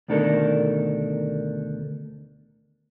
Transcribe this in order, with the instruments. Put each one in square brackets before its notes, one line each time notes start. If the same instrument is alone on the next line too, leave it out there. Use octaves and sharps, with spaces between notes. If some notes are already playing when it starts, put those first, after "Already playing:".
[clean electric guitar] D2 B2 D#3 D4 A4 A#4